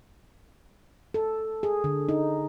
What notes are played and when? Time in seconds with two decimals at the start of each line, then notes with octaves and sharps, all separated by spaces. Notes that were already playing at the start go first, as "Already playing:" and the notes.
1.14 A4
1.63 G#4
1.84 D3
2.09 D#4